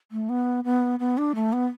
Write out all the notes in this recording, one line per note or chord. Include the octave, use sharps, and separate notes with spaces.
A3
B3
B3
B3
D4
A3
B3